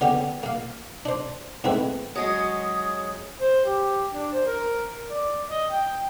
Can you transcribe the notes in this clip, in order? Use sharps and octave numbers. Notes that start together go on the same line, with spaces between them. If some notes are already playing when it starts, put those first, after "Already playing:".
D3 B3 C#4 G4
A#3 F5
D4 C5
G#2 A3 C4 E4 B4
F#3 G#3 C#4 D#6
C5
G4
D4
C5
A#4
D5
D#5
G5